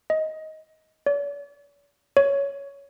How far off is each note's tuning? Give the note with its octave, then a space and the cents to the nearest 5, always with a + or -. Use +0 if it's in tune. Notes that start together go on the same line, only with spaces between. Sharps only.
D#5 +15
D5 -45
C#5 +10